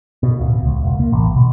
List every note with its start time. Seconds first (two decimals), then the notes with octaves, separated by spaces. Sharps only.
0.23 B2
0.39 D1
0.66 C#2
0.83 E1
0.99 A#3
1.12 A1
1.36 B2